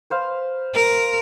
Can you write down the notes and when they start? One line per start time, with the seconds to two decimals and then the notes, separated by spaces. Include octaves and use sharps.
0.10 B4 C5 F5
0.75 A#4